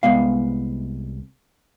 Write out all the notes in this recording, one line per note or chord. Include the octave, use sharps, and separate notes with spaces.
C2 G#3 B3 F5